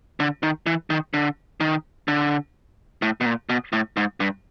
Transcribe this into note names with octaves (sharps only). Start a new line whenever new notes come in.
D3
D#3
E3
D#3
D3
D#3
D3
A2
B2
A#2
B2
A2
G#2
G2